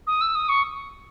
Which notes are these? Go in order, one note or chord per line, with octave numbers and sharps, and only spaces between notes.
D#6
E6
D#6
C#6